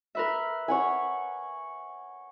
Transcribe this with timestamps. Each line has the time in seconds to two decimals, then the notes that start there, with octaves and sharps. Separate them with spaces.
0.15 A#4 B4 E5
0.68 C#5 F#5 G#5